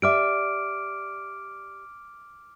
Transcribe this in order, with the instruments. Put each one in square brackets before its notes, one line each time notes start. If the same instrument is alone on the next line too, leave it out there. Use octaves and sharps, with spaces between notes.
[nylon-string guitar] G4 D5 E5 [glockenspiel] D6 F6 D7